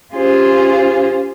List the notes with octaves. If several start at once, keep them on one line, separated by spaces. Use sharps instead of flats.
C#4 F4 G4 G#4 C5